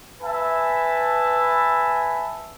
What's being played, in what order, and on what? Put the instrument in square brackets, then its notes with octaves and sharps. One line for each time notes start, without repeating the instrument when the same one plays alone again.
[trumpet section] B4 E5 G#5 A5